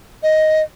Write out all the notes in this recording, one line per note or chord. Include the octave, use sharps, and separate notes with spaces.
D#5